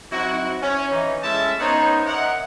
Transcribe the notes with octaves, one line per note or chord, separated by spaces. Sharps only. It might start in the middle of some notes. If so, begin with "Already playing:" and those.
F#3 C4 D#4 E4 F#4
C#4
E3 D#4
G#3 A3 C#4 E4 E5 A5
B3 C#4 D#4 C5 C#5
A#4 D#5 E5 F#5